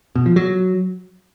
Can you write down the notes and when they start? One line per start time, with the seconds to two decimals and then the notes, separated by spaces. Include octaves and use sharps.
0.16 B2
0.26 F3
0.36 F#3